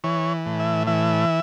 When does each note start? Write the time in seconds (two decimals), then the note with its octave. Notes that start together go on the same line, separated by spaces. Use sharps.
0.04 E3 C#5
0.46 A2
0.60 E5
0.87 E3 E5